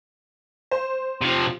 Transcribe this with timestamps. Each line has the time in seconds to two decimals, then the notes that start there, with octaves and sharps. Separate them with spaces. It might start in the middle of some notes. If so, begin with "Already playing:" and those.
0.71 C5
1.21 C3 F3